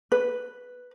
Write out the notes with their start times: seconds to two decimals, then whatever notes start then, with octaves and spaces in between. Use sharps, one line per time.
0.12 B4